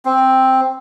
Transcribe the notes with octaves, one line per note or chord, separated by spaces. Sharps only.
C4